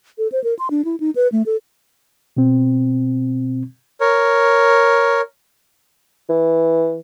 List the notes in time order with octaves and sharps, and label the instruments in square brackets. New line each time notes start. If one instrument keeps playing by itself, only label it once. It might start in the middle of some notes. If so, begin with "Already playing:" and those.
[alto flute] A4
C5
A#4
C6
D4
E4
D#4
B4
A3
A4
[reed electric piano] B2 C4
[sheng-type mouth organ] A#4 C#5
[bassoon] E3